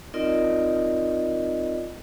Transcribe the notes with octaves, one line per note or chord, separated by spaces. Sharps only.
C4 D#4 F4 A#4 D5 D#5